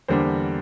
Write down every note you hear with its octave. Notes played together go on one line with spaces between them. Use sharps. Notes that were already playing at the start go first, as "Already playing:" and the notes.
E2 D3 G3 A#3 D4 C5